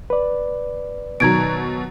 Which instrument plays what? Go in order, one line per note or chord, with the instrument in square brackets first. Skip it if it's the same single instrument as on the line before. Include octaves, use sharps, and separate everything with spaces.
[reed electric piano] B4 D5
[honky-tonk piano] B2 D#3 F#3 [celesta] A#5 G#6 D7